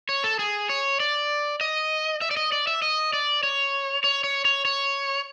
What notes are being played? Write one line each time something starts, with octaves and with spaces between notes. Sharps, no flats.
C#5
A4
G#4
C#5
D5
D#5
E5
D5
D#5
D5
E5
D#5
D5
C#5
C#5
C#5
C#5
C#5